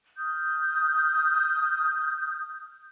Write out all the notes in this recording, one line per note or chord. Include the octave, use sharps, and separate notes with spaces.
D#6 F6 G6